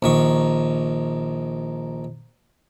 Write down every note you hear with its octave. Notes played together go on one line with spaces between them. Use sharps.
A#1 D#3 C#6